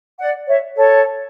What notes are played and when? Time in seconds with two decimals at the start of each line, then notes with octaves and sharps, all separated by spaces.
0.19 D5 F#5
0.47 C#5 E5
0.75 A4 C#5